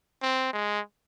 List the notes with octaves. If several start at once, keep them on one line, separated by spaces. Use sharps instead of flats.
C4
G#3